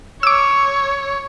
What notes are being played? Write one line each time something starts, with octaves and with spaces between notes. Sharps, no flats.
C#5 D6 E6